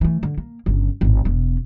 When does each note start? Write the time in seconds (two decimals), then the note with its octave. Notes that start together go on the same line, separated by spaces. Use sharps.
0.01 E3 A3
0.23 D3
0.38 A#3
0.66 G1 C#3
1.01 G#1 A2
1.25 E1 B2